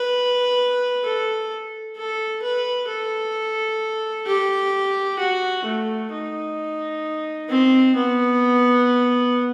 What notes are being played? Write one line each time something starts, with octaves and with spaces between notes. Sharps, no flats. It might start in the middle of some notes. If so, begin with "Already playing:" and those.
Already playing: B4
A4
A4
B4
A4
G4
F#4
A3
D#4
C4
B3